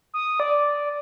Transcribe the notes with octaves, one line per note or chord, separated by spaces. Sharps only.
D#6
D5